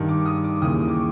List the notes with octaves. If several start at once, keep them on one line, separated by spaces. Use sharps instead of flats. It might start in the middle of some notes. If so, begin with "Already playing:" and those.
Already playing: G2 D#3
D6
D#6
D6
D#2 C#3 E3 D#6
D#6
D6
C#6